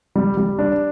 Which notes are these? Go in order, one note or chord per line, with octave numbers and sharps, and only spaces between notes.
G3
G3
D4